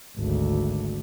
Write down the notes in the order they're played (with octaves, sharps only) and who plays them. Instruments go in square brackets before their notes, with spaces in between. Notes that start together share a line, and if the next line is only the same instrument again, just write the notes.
[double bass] G#1 D2